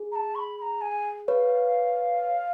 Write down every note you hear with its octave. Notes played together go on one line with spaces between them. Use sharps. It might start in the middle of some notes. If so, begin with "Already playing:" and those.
Already playing: G#4
A#5
A5
C#6
B5
B5
A#5
G#5
B4 C#5 F5